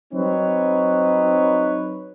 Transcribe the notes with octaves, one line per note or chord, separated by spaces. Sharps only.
F#3 C4 D#4 B4 C#5